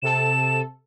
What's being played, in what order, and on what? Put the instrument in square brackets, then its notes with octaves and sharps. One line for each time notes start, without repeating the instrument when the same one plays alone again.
[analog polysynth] C3 A4 [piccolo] E7